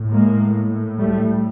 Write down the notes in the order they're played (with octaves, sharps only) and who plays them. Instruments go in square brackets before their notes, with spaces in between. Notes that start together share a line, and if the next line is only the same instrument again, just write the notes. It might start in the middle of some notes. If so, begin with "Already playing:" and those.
Already playing: [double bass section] A2
G#3 A#3
G3 A3